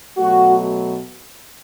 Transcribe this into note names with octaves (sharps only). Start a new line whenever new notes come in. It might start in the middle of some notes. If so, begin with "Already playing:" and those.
B2 F#3 A3 F#4